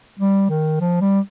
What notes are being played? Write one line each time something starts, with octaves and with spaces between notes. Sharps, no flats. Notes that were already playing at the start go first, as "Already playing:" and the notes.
G3
D#3
F3
G3